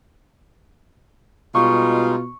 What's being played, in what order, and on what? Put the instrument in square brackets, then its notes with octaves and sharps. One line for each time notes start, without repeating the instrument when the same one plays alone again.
[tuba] B2 [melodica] G3 G#3 D#4 [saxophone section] F4 [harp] C#6